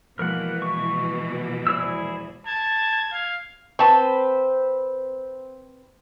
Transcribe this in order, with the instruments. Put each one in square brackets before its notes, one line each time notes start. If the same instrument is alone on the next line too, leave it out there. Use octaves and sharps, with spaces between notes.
[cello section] B2 E3 [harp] F3 G#3 A#3 [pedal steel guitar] A#4 F#5
[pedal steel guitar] C#6
[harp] E1 C5 D5 [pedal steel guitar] E4 G#4 E6
[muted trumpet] A5 [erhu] G#6
[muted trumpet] F5
[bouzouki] C4 B4 C5 [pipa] A5 C#6